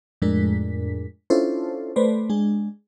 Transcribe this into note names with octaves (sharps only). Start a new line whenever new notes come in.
F2 A2 G#3 D4 A#4 B6
C#4 D4 E4 F4 A4 C5
A3 B4 C5 D5
G#3 D4 G#4